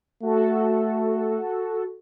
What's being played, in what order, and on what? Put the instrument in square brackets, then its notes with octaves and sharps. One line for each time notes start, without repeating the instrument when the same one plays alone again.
[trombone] A3 [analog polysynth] F#4 A4